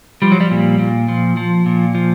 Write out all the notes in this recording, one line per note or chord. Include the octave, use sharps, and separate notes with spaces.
F3 G3
F#3
G3
A#2
A#2
F3
F3
A#2
F3